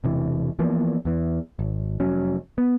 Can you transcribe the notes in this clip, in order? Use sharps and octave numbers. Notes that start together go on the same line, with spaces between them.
E1 C3 E3
E3 F3 A#3 B3
E2 E3
G#1
F1 F#3 C#4
B3